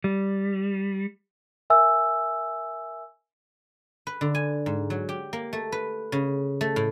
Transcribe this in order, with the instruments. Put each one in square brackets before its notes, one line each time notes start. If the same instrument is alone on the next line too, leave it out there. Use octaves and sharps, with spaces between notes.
[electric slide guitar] G3
[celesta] A#4 E5 G#5 E6
[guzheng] B4
D3
G#5
G#2
F#3
G4
A#3
A3
B4
C#3
A3
A2